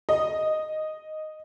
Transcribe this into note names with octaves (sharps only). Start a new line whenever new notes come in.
D#5